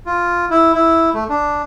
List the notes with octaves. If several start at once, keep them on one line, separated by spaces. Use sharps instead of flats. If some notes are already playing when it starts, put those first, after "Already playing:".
F4
E4
E4
A3
D4